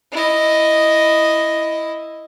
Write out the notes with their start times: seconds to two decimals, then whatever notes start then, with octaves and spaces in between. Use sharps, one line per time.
0.12 E4 D#5